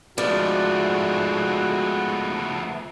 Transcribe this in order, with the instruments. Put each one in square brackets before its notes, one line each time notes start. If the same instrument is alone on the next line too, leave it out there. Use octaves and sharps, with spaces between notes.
[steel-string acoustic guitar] F3 D5 [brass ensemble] G#3 D#4 F#4 [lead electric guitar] A3 B3